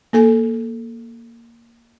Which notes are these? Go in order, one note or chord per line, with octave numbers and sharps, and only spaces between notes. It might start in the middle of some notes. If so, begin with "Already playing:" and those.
A#3 A4 G#5